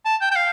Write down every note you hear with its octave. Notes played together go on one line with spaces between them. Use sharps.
A5
G5
G5
F5